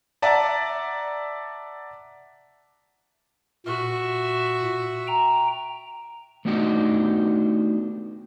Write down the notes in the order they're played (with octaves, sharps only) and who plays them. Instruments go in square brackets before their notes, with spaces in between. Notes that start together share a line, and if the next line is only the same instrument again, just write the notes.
[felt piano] D5 E5 F#5 A5 A#5 D6
[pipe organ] A#2 [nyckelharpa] F#4 E5
[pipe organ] G5 A#5
[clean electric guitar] A3 B3 D4 D#4 F#4 G4